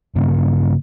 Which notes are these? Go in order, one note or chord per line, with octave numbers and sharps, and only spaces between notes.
G2 C#3 A#3